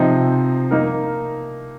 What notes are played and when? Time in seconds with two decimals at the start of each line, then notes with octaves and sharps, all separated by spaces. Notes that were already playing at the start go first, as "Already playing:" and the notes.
Already playing: C3 F3 C4 D#4
0.71 A#3 D#4 A#4